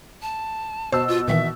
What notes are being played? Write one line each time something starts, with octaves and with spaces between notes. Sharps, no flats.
A5
B2 C5 A5 E6
F4
A#2 D#3 E3 E5